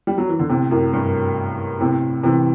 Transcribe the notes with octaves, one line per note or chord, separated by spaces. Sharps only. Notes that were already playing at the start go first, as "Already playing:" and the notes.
G3
F#3
E3
D3
A2 C3
F#2 A2
G2
A2 C3
C3 E3